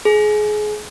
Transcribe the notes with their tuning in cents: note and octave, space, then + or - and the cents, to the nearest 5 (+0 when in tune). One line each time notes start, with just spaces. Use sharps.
G#4 +25